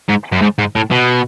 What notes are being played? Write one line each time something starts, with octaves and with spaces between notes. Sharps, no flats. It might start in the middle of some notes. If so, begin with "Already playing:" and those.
G#2
F#2
G#2
G#2
A2
B2